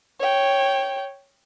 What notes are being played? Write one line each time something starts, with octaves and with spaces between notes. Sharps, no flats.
C#5 G5